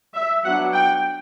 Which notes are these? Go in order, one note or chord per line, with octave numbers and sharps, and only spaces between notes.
E5
F#3 B3 D4 F#5
G5